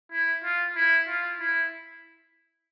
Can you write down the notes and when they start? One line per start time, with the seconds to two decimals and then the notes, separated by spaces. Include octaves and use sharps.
0.12 E4
0.44 F4
0.76 E4
1.07 F4
1.40 E4